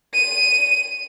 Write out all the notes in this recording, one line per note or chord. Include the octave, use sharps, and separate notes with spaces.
D#7